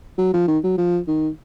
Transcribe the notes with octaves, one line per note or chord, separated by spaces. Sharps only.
F#3
F3
D#3
F#3
F3
D#3